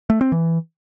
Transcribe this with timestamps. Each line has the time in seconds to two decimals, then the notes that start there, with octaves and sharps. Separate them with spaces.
0.10 A3
0.21 C4
0.32 E3